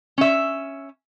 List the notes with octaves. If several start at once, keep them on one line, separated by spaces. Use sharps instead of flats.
C#4 E5